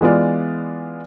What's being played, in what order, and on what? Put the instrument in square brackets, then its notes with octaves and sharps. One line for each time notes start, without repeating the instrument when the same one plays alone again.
[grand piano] E3 G#3 B3 F4 D5